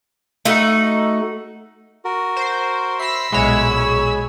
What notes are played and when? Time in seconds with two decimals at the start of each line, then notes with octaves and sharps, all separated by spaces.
0.45 A3 D#4 F#4
2.05 F#4 A#4
2.37 C5
3.00 C5 E5 B5 E6 A#6 C7
3.32 B1 A#2 G#3 E4 G#4 C#5 F#5
3.77 G#5